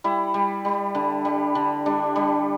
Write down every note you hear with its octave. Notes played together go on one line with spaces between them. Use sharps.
G3 E4
G3
G3
D3
G3
D3
G3 D4
G3